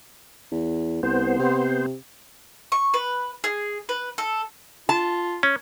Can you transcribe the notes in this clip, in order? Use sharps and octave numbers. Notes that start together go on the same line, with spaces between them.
E2
C2 B3 C5
C3
C#6
B4
G#4
B4
A4
F4 A5
C#4